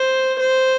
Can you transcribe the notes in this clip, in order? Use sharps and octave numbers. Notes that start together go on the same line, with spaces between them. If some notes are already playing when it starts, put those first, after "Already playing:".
Already playing: C5
C5